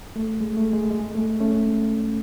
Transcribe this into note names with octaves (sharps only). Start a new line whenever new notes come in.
A3
G#3
A3
G#3
G#3
A3
A3 C#4